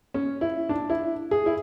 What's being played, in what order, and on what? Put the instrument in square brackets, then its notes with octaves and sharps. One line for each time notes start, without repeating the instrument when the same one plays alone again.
[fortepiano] C#4
E4
D4
E4
G#4
E4